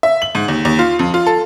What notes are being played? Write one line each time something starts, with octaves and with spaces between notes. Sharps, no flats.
E5
F#7
G#2
D#2
D#2
F4
F2
F4
A4